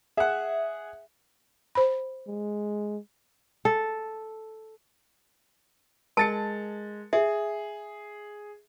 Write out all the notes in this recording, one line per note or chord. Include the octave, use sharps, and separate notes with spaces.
G#4 E5 F#5
C5 B5
G#3
A4
G#3 A#4 A5 A6 C#7
G#4 E5